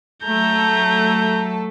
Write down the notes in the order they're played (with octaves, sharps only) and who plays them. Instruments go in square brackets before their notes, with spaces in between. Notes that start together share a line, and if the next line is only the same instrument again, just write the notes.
[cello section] F#3 A3 A4 [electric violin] A#5 G6